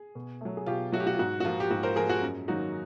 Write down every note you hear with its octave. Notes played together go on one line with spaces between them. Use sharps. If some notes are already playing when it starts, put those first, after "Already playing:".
Already playing: G#4
B2
F#3 A3
G#4
B2 F4 G4
F#3 A3 F#4
G4
F#4
F4
G#2 F#4
F#4
F3 A#3 F4
G4
G#2 F#4
A#4 C5
F3 A#3 G#4 A#4
F#4 G#4
F#2
D#3 F#3 A#3 D#4 F#4